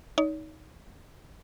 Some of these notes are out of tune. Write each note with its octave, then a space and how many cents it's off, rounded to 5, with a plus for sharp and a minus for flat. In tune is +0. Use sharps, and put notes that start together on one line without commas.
D#4 +10 C#5 +45